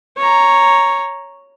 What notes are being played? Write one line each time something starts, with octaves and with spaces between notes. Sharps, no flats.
C#5 A#5